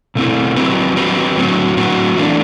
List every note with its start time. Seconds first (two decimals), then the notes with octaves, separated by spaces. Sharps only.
0.15 B2 A3 C4 E4
0.56 F#3 C4 G4 B4
0.96 F#3 C4 G4 B4
1.37 A2 F#3 C4 F#4
1.77 A2 F#3 C4 F#4
2.17 E3 A3 D4